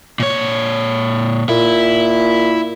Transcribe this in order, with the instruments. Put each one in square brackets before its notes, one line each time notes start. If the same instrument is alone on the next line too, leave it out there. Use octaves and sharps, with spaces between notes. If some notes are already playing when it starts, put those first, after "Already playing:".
[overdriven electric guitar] A#2 C#5
[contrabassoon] A#2 [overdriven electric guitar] E4